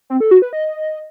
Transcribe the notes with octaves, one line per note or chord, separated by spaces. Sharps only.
C4
A4
F#4
B4
D#5